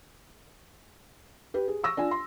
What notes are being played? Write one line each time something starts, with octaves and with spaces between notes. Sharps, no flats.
G4 B4
G#4
C#6 E6 A#6
D4 F4 G#5
C6